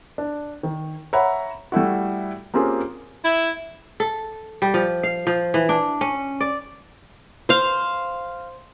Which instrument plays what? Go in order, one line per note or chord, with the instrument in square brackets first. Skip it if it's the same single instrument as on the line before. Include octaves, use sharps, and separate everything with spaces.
[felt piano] D4
D#3
C#5 E5 F#5 A#5 B5
G3 A3 E4 F#4
A#3 C4 C#4 F4 G4 G#4
[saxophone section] E4
[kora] A4
G3
F3
F5
F3
E3
D4
C#4
D5
[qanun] C5 F5